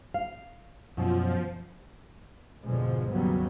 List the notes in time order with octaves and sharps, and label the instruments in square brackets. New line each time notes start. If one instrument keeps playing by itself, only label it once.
[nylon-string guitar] F5
[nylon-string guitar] F#2 B2 [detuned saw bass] F3
[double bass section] F2 G#2 B2 D3 F3 G#3
D#2 C#3 F#3 G3 B3